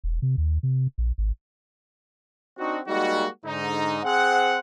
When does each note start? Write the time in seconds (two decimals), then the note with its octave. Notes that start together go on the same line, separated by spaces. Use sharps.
0.04 E1
0.22 C3
0.38 D#2
0.63 C3
0.98 A#1
1.18 G#1
2.58 C4 D4 D#4 F#4
2.88 G3 G#3 A#3 D#4 F#4
3.46 G#2 D3 D#4
4.04 C4 G#4 C5 F#5